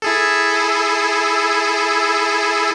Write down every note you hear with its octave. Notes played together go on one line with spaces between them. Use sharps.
E4 G#4 A4